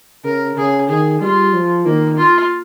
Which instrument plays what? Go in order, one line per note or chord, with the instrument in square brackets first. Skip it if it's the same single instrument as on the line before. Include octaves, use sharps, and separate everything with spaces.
[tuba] C#3 [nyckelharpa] A#4
[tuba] C#3 [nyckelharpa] G#4
[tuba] D#3 [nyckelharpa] G#4
[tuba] G3 [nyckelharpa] F4
[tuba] F3
[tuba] D#3 [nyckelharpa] A#3
[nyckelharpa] F4